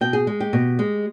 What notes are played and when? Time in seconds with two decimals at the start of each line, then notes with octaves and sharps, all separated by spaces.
0.01 B2 G5
0.13 G#4
0.27 G#3
0.40 G4
0.53 B2
0.79 G#3